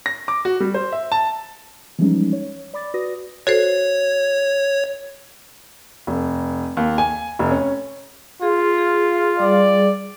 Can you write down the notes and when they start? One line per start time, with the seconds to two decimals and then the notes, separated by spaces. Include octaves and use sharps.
0.06 A#6
0.28 D6
0.45 F#4
0.60 G3
0.74 C5
0.92 E5
1.12 A5
1.99 E3 F3 G3 G#3 C#4 D#4
2.33 C#5
2.74 D5 B5 D6 A6
2.94 F#4 B4 D5 D#6 A#6
3.47 F#4 A4 C5 C#5
6.07 F1
6.77 D#2
6.98 G#5
7.39 F1
7.51 C#4
8.42 F4 G#4
8.78 G#4
9.39 G3 G#4 D5